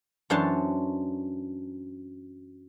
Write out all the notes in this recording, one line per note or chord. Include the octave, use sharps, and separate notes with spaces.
F#2 E3 D4 C5 C#5 A5